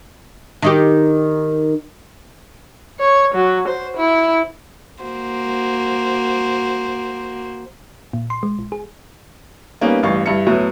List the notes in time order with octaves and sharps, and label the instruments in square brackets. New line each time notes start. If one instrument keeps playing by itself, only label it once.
[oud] D#3 D#4 G4
[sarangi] C#5
F#3
C5
E4
[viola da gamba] A#3 F#4 C5
[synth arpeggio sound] A#2
C6
G#3
A#1
G#4
[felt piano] G3 A#3 B3 C#4 D#4
A1 G2 F5 C#6
G2 E4 C#7
A2 F#3 B3 E4